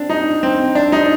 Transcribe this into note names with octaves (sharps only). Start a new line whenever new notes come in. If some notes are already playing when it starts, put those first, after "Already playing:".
Already playing: C4 D4
D#4
C4
D4
D#4